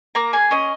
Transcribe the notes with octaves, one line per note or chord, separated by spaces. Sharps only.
A#3 A#5
G#4 G#5
C#4 D#5